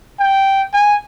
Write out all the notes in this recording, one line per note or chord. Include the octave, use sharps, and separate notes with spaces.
G5
G#5